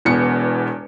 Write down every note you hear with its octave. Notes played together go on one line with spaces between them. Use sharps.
E1 E2 B3 C#7